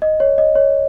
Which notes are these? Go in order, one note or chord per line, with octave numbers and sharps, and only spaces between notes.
D#5
C#5
D#5
C#5